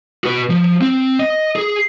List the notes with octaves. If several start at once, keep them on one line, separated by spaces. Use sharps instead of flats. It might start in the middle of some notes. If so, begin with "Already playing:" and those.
F#4 B4
F3
C4
D#5
G#4